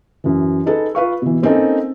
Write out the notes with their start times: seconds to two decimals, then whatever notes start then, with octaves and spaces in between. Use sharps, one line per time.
0.24 F#2 E3
0.66 D#4 G#4 A4 B4
0.95 F4 B4 F5 C#6
1.22 B2 E3
1.42 A#3 C4 C#4 D#4 A4